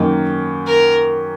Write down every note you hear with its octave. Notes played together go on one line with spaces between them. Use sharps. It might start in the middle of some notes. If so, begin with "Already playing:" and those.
Already playing: F#2 D#3 A#3 D#4
A#4